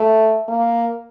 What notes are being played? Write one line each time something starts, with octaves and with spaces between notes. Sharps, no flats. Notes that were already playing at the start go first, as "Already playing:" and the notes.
Already playing: A3
A#3